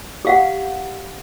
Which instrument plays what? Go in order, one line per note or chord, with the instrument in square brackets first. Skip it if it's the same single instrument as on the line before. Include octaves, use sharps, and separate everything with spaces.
[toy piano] G4 F5 F#5